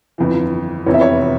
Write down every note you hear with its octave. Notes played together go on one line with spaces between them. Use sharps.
G1 F2 E3
F1 E2 C3 E3 C#5
E5
C#5